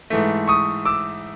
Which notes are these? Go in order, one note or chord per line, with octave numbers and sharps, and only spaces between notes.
G#2 E3 A3
C#6 D#6
D6 E6